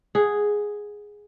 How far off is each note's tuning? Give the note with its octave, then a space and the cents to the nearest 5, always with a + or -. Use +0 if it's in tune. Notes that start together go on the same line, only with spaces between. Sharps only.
G#4 +0 F#5 +0